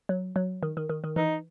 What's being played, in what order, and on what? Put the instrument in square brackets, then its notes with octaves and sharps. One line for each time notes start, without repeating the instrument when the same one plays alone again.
[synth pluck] F#3
F#3
D#3
D#3
D#3
D#3
[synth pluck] E3 [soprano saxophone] D#4